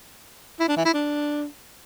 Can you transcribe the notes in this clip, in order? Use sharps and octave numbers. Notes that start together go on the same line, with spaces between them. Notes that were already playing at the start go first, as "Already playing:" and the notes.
E4
D4
E3
E4
D4